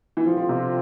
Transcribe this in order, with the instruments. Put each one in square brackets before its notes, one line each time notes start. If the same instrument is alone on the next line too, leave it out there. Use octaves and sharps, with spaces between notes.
[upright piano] E3
[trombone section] D3 G3 C4 F4 [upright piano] F3
[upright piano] F3
C3